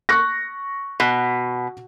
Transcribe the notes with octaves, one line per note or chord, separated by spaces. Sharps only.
C#6 F#6 A#6
B2